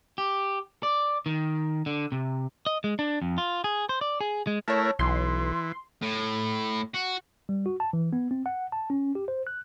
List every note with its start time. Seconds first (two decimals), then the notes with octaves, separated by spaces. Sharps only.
0.18 G4
0.83 D5
1.26 D#3
1.86 D3
2.12 C3
2.66 D#5
2.84 G#3
2.99 D4
3.22 F2
3.38 F4
3.64 G#4
3.89 C5
4.01 D5
4.21 G#4
4.47 G#3
4.68 A3 E4 A#4 C#5 A5
4.99 B1 E3 C6
6.03 A2
6.94 F#4
7.49 G3
7.66 F#4
7.80 A5
7.93 E3
8.13 B3
8.31 C4
8.46 F#5
8.72 A5
8.90 C#4
9.15 G4
9.28 C5
9.47 F#6